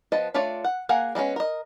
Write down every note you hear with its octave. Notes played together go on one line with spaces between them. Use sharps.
F3 B3 D#5 A5
A3 D4 F4 C#5 D5
F#5
A#3 G#4 F5 F#5 G#5
G3 G#3 B3 C#4
A#4 D#5